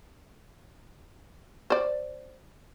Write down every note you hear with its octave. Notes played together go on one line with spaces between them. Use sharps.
C5 D5